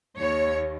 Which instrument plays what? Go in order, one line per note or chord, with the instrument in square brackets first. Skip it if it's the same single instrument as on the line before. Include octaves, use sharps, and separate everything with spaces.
[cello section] D#2 C#5